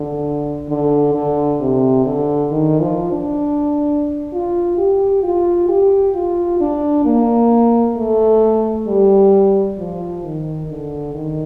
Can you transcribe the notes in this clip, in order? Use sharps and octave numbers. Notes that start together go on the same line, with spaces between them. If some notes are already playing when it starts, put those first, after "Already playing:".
Already playing: D3
D3
D3
C3
D3
D#3
F3
D4
F4
G4
F4
G4
F4
D4
A#3
A3
G3
F3
D#3
D3
D#3